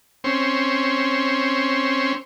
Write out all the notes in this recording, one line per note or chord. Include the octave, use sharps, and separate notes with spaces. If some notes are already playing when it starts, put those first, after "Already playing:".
C4 C#4